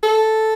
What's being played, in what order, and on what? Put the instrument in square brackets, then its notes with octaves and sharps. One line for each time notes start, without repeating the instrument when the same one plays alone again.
[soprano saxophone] A4